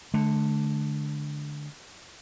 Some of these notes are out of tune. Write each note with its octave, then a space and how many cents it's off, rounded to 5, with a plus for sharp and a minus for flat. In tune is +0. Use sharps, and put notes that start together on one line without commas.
D3 +0 A3 -45